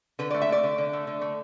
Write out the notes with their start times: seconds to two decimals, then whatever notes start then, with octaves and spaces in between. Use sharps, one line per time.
0.19 D3 B4
0.30 D5
0.34 A3
0.42 E5
0.49 A3 D5
0.64 D3
0.78 D3
0.93 A3
1.07 D3
1.21 A3